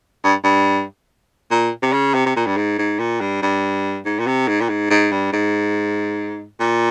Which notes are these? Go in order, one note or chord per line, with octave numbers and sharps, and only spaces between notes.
G2
G2
A#2
C3
C#3
C3
C3
A#2
G2
G#2
G#2
A#2
G2
G2
G#2
A#2
C3
G#2
A#2
G#2
G#2
G2
G#2
A#2